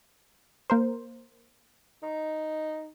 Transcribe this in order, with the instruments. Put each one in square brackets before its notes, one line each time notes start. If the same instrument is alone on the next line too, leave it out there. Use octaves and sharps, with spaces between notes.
[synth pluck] A#3 A#4 C5
[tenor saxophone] D#4